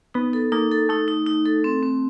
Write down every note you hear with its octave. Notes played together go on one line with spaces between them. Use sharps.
B3 D#4
A4
A#3 D#4
A4
A3 D#4
D#4
D#4
A4
C4
C4